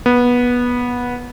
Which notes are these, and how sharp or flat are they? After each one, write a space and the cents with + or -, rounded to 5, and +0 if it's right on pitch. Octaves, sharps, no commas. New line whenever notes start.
B3 -15